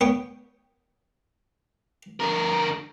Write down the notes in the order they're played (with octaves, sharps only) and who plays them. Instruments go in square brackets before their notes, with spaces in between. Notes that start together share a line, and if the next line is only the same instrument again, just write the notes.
[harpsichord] B3 C#5 G5
[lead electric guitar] D3 A#4